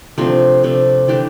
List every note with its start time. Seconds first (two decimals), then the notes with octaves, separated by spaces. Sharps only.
0.18 C3 F3 A3 D4
0.63 C3 F3 A3 D4
1.08 E3 A3 D4 G4